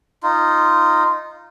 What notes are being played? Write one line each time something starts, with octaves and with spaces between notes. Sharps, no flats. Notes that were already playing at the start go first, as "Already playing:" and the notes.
D#4 F4